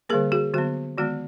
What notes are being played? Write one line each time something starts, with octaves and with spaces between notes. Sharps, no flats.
D3 G3 A#3 G#4 A#4
F#4 G#4
D3 F#3 B3 F#4
D#3 G#3 B3 F#4